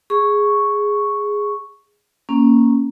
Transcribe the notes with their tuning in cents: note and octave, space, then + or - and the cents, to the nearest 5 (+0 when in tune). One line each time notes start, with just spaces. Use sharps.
G#4 -5 C#6 +0
A#3 +0 C#4 -5